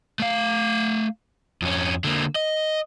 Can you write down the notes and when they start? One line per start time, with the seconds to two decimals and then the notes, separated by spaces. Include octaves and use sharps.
0.20 A3 F5
1.62 F2 C#4
2.04 D3 A#3
2.35 D#5